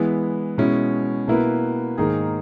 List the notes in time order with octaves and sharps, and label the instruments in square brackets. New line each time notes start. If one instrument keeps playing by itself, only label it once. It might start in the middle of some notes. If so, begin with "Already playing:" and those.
Already playing: [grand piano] E3 G#3 B3 E4
B2 G#3 C#4 E4
B2 A#3 E4 B4
G#2 D#3 A#3 D#4 G#4